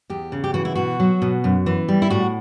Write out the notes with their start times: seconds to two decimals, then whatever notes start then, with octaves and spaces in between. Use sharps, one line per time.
0.10 E2 G4
0.32 C#3
0.44 G4
0.54 E3 F#4
0.65 E4
0.75 B2 F#4
1.00 F#3
1.22 B2
1.44 F#2
1.66 E3
1.89 G3
2.02 E4
2.10 A2 F#4